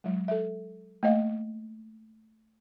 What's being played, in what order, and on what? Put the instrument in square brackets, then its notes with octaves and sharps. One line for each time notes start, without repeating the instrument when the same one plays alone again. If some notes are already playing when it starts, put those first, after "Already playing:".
[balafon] F#3 G#3
A4 E5
A3 A#3 D#5 F5